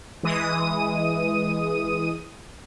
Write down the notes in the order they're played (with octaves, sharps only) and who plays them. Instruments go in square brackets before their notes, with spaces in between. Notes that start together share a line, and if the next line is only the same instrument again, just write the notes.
[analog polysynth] E3 G#3 D#6 D#7